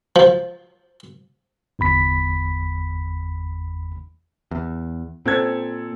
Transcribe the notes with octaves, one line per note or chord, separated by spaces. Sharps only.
F3
G1 E2 B5 B6
E2
A#2 C4 A4 G#6